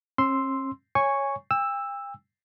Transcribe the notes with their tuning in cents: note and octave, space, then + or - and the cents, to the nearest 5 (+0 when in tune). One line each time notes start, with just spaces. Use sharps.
C#4 -45 C6 +0 E6 +0
C#5 +0 G#5 -10 C#6 +0
G5 +40 E6 +0